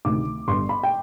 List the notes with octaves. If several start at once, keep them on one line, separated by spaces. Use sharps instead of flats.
D2 C3 D#3 D6
G1 G2 D3 C6
B5
G5